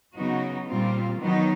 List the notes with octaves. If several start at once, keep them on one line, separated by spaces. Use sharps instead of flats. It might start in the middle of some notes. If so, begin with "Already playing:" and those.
C#3 F#3 B3 D#4 F#4
A#2 G3 C4 F4
D#3 F#3 B3 D#4